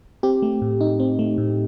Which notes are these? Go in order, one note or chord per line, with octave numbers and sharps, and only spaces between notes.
C4 G4
A3
A2
D#4
C4
A3
A2